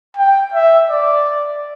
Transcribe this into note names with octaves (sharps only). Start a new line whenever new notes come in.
G5
E5
D5